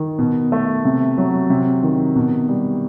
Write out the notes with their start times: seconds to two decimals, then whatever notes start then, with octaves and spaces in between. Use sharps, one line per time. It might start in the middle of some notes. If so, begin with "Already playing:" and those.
Already playing: D#3
0.18 B2
0.52 A3
0.85 C3
1.18 F#3
1.50 C3
1.83 D#3
2.16 B2
2.49 G3